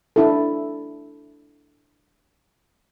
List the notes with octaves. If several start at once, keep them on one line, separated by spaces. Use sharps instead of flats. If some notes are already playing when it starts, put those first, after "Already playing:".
D4 E4 A4